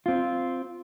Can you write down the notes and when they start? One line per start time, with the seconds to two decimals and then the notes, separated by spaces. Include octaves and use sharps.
0.06 C4 F4